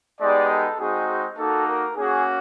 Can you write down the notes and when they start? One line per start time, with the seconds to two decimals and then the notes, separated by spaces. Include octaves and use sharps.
0.19 G#3 B3 D#4 G4 D5
0.50 A4
0.79 G#3 C4 D#4 F#4 G#4
1.37 A#3 D#4 F#4 A4
1.67 A#4
1.97 A#3 C#4 F#4 G#4